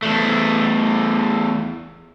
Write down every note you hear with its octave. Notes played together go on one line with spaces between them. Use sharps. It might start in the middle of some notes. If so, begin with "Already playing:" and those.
E2 A3